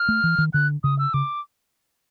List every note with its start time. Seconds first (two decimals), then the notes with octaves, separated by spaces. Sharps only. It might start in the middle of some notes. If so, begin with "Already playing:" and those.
Already playing: F6
0.09 A3
0.24 E3
0.38 D#3
0.53 D3 F#6
0.84 C#3 D#6
0.99 E6
1.14 C#3 D6